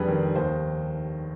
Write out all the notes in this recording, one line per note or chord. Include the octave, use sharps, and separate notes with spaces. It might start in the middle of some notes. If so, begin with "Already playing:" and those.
Already playing: F1 D3 G3 G#4 B4
D#3
D#2 C5